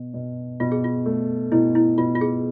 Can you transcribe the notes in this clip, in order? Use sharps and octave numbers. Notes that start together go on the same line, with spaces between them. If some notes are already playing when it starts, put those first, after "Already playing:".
Already playing: B2
B2
B2 F4
G#4
F4
A3
B2 E4
E4
B2 F4
F4
G#4